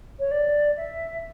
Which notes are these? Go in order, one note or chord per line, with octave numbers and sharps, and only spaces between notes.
C#5
D5
E5